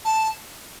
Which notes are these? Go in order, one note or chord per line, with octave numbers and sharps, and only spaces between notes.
A5